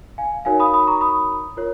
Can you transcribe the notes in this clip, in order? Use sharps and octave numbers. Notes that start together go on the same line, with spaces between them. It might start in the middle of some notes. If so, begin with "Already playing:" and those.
F5 G#5
D#4 F#4 A#4 C#5 F5 G#5
B5 D#6
B5 D#6
A#5 C#6
B5 D#6
F4 A#4 C#5